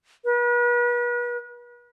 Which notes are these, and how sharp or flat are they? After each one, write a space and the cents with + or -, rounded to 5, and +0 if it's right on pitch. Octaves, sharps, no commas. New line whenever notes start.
B4 -40